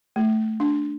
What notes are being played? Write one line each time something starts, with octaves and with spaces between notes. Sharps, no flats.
A3
D4